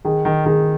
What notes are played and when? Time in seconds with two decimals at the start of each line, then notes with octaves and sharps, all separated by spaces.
0.05 D#3 G#4
0.25 D#3
0.46 D#3 G#4